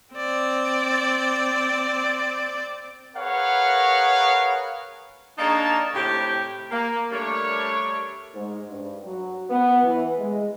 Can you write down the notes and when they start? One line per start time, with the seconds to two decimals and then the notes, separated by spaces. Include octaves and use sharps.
0.13 C4 D5
3.16 G#4 A#4 B4 C#5 F5 F#5
5.38 A#3 D4 D#4 G#4 C#5 A5
5.93 A2 C3 G4 G5
6.70 A#3
7.10 G3 A3 D4 A#4 C#5
8.34 G#2
8.70 G2
9.05 F#3
9.49 B3
9.84 E3
10.18 G#3